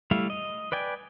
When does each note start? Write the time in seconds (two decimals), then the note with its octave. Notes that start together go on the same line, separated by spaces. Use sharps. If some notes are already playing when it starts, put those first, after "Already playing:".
0.11 G3 A3 E4 F5
0.30 D#5
0.72 B4 D5 G5 G#5